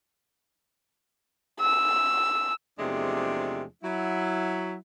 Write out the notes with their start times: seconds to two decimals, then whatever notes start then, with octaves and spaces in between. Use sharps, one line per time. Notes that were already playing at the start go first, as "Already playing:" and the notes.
1.60 E6
2.79 E2 C3 F3 G#3 A3 D4
3.83 F#3 E4